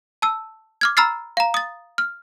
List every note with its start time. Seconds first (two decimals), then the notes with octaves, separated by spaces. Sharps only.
0.22 A5 E6
0.81 D6 F6 G#6
0.97 A#5 B5 E6 F6 A6 C7
1.37 F5 A#5
1.54 D#6 A6
1.98 F6